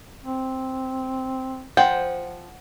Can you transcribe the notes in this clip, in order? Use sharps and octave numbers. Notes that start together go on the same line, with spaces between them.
C4
F3 C5 F#5 G5